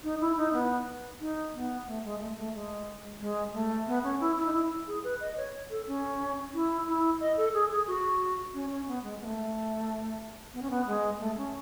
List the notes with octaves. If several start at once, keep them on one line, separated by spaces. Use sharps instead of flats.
D#4
E4
D#4
B3
D#4
B3
A3
G#3
A3
A3
G#3
G#3
A3
B3
C#4
E4
E4
D#4
E4
G#4
B4
D#5
C#5
A4
C#4
E4
E4
D#5
A4
G#4
G#4
F#4
C#4
C#4
B3
G#3
B3
A3
B3
C#4
B3
G#3
A3
C#4